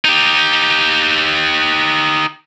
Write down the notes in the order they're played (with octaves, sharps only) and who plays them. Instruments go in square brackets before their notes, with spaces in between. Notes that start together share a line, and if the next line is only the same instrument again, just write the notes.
[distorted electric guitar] D#4 G4